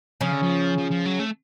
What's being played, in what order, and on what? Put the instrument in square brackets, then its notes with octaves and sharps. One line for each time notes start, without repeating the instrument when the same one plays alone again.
[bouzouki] C#3 C#4 [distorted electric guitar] F3
[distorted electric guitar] D3
F3
F3
F3
F#3
A3